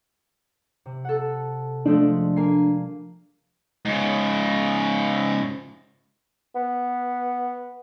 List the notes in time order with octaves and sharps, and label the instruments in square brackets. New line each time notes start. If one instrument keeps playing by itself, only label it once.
[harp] C3
A4 F#5
[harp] F3 G#3 A3 [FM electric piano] D4
[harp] A#3 G#5 C7
[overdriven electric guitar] G#2 C#3
[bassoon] B3